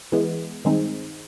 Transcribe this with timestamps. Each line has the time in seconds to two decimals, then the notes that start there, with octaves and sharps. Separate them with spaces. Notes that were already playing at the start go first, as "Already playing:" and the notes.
0.12 E3 G#3 B3
0.65 G2 D#3 G#3 C4 D#4